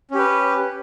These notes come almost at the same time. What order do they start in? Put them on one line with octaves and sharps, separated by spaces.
C#4 G4 B4